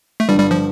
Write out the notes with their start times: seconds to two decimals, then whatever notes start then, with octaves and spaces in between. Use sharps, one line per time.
0.20 A3
0.29 G1 G2 D3 G3
0.40 G3
0.51 F3